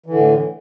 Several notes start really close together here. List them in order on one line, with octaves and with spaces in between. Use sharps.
E3 D3 A2